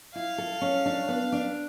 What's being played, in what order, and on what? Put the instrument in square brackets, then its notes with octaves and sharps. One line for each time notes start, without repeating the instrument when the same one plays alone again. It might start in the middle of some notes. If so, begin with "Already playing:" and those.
[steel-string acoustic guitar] E4 [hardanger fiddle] F5
[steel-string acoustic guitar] A4
C#4
D4
B3
D4